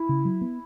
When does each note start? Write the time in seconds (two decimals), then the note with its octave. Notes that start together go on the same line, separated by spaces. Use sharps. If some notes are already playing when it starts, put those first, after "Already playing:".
Already playing: E4
0.09 C#3
0.25 F#3
0.41 B3